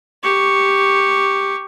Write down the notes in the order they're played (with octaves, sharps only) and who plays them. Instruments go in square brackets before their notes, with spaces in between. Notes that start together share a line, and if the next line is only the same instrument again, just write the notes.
[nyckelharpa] G4 C#6